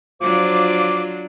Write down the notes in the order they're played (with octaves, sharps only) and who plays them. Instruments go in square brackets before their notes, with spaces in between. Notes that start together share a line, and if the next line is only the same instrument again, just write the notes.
[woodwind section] F3 C5 D6 [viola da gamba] F#3 D4 F4